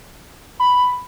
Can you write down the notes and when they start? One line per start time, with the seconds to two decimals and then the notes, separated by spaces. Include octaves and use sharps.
0.60 B5